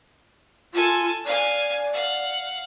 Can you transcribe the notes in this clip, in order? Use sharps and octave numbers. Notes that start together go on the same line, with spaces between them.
F4 A4 G#5
D5 F5 G#5
F5 F#5